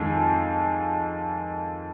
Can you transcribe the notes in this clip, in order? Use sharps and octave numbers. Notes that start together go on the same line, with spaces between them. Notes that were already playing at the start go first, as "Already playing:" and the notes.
Already playing: F2 D#3 G#3